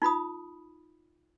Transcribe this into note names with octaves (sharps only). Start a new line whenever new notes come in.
D#4 F4 B5 D#6